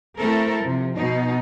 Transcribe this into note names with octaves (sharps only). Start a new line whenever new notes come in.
A3 C4 E4 A4 A#4
C3 F3
B2 D#4